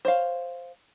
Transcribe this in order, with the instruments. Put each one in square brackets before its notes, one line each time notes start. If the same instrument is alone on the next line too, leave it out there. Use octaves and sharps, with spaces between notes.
[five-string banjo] C5 C#5 F5